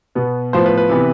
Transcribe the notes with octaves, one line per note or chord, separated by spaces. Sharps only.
B2 B3
A2 F3 B3 C5
B4
B4
C3 E3 B3